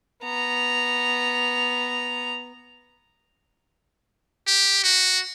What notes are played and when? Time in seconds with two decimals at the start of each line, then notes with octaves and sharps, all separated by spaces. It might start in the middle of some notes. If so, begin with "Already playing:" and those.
0.24 B3 A#5
4.47 G4
4.83 F#4